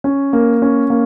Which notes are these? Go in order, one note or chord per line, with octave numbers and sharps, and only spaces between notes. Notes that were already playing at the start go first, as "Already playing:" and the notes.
C#4
A#3
C#4
A#3